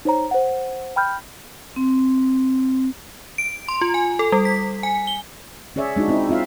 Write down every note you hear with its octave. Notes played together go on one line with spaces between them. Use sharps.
D#4 C5 C#5 A#5
C5 F#5
G5 B5 F6 G6
C4
D7
C6
F4
G#5
A4
G3
B6
G#5
G7
C#4 G#4 C#5 D5 E5
G#3 D4 D#4 F#4
C4 D#4 E4
C4 F4 E5 F5